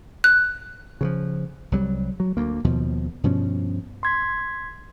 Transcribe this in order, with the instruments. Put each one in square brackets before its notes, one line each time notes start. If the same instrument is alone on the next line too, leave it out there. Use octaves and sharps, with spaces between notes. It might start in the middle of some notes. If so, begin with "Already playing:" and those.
[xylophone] F#6
[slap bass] C#3 E3 F3
C2 F#3 G3
F#3
D2 A#3
D#2 B2 F3
G2 B2 F3 C#4
[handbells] C6 G#6 B6